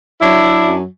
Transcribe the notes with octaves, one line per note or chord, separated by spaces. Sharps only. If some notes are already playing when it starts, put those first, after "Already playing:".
F#3 D4 E4
F#3
F#2